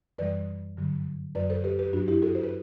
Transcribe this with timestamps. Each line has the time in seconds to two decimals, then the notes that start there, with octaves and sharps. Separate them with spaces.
0.18 F#2 E3 G3 B4 D5
0.77 G2 D3 F#3
1.35 F#2 F#3 B4 D5
1.50 A4 C5
1.64 G4 B4
1.79 G4 B4
1.93 G2 F#3 D4 F#4
2.08 E4 G4
2.22 F#4 A4
2.35 C5
2.44 B4